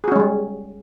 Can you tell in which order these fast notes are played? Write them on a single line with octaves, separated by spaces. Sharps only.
G#4 F#4 C#4 G#3 G3